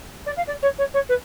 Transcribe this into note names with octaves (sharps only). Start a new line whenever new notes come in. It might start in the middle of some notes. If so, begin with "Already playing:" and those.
D5
F5
D5
C#5
C#5
C#5
B4